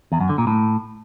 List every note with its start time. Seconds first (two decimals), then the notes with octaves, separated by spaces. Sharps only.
0.12 E2
0.20 F#2
0.29 D3
0.38 A#2
0.47 A2